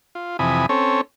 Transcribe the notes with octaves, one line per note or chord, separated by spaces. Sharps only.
F4
F2 C3 E3 G#5 B5 D#6
C4 C#4 A4 C#5